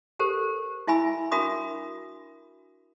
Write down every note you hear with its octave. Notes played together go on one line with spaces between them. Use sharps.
G4 A4 A#4 C5
E4 E5 G#5 B5 E6
D4 F#4 A#4 E5 B5 D#6